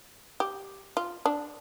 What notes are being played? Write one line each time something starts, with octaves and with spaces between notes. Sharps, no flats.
G4
F4
D4